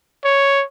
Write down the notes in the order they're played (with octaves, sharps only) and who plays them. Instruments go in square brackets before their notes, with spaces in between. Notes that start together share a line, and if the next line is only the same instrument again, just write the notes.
[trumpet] C#5